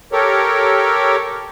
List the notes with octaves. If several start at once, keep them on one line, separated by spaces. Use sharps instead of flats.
G4 A4 A#4 C#5